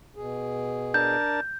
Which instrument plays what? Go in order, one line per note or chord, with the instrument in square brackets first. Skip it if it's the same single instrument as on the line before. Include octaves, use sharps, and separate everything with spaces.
[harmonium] B2 G#4
[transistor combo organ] D4 A#4 A5 [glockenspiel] G6